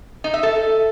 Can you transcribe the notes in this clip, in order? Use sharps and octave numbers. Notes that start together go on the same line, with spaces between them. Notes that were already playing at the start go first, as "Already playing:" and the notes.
D#4
E5
A4